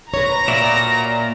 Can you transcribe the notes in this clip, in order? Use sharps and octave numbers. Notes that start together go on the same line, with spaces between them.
B4 C#5 A#5 A#6
A#2 F#4 D5 E5